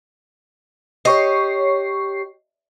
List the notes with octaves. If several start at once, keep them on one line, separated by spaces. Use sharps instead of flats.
G4 C#5 D#5 C#6 C7